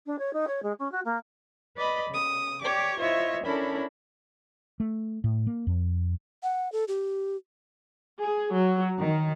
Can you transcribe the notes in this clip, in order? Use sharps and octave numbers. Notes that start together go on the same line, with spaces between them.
D4
C#5
D#4
C#5
G#3
C#4
F#4
A#3
B4 D5 D#5 B5
C#3 D#6
G4 C#5 D5 D6
E4 F4 C5 C#5 D#5 E5
C#4 D4 E4 A4 A#4 B5
A3
A2
A#3
F2
F#5
A4
G4
G#4
F#3
D#3